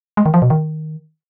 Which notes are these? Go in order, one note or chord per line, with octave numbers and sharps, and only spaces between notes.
G#3
D#3
F3
B2
D#3